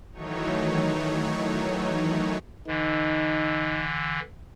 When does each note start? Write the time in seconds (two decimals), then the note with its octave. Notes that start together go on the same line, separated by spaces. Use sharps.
0.12 D#3 E3 F#3 A3 D#4 C#5
2.67 D3 E3 D#4